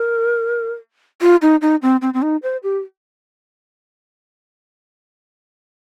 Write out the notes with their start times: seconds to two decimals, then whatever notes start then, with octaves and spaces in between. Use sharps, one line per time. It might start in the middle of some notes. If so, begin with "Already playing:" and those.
Already playing: A#4
1.22 F4
1.42 D#4
1.61 D#4
1.82 C4
2.02 C4
2.14 C4
2.22 D#4
2.43 C5
2.63 G4